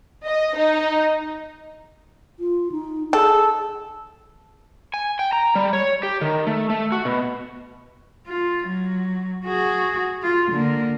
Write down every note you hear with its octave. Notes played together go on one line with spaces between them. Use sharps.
D#5
D#4
F4
D#4
G#4 A4
G#5
G5
A#5
G3
C#5
G4
D#3
A3
A3
F#4
B2
F4
F#3
F#4 G#4
F4
D3 A#3